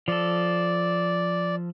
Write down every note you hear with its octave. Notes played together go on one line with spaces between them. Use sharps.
F3 A4 D5